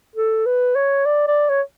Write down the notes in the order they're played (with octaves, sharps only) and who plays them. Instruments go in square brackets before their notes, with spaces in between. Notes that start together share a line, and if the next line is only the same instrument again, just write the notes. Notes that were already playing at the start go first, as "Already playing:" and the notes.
[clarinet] A4
B4
C#5
D5
D5
C#5